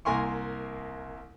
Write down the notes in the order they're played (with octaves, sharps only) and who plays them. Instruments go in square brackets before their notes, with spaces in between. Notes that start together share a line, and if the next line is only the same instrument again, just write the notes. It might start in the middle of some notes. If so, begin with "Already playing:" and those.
[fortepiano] C2 A#3 A#4 G#5 C6 C#6